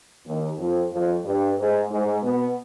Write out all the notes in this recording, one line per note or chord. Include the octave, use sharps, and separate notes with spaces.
D#2 D#3
F2 F3
F2 F3
G2 G3
G#2 G#3
G#2 G#3
B2 B3